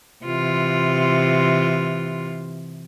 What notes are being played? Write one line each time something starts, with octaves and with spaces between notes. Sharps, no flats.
C3 E3 F4